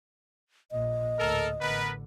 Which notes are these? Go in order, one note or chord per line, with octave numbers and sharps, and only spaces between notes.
A#1 A#2 D#5
D2 A2 A4 A#4
A1 D3 B3 A#4 B4